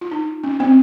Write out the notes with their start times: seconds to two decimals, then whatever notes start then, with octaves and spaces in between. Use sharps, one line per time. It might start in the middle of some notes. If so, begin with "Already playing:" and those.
0.01 F4
0.11 D#4
0.44 C#4
0.60 C4